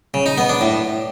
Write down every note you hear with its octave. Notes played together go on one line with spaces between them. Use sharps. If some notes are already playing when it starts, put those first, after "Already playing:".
C#3
D#4
B3
D4
A2